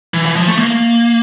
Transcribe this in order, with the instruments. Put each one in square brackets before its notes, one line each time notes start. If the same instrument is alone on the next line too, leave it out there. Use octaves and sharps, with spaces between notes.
[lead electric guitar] E3
E3
F3
A3
A#3